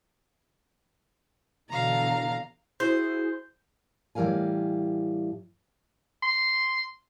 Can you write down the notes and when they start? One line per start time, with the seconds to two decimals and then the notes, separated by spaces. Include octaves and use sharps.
1.69 B2 D3 E3 F5 A#5
2.80 E4 F#4 G#4 C5 G6
4.15 A2 E3 G3 A#4 F5 G#5
6.23 C6